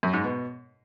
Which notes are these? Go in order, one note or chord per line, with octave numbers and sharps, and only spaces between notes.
F#2
G#2
B2